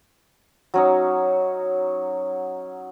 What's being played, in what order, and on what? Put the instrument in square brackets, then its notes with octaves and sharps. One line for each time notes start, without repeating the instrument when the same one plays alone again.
[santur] F#3 C#4 D#4